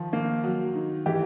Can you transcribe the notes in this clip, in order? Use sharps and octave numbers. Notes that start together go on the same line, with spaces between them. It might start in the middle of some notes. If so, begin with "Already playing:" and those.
Already playing: D#3 F3
A#3
F#3
D#3
E3 G4